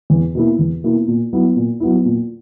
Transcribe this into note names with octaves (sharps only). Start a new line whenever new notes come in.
E2
B2 A#3 E4
E2
B2 A#3 E4
A#2
F#3 B3 E4
A#2
F#3 B3 E4
A#2